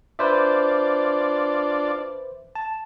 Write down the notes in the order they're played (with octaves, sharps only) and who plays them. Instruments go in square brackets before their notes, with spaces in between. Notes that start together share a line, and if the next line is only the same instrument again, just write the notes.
[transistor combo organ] D4 F4 D5 [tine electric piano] B4 C5 E5
[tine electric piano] A5